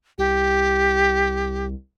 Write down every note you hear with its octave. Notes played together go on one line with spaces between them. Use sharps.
C2 G4